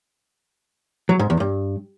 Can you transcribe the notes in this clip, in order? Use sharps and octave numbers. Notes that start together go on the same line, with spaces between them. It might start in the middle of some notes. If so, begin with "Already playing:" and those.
F#3
G#2
E2
G2